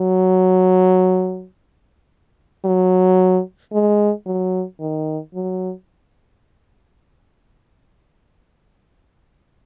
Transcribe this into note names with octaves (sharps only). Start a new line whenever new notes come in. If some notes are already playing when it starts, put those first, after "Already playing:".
Already playing: F#3
F#3
G#3
F#3
D#3
F#3